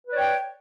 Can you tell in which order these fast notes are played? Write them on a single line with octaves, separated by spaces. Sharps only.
B4 D5 C#5 G5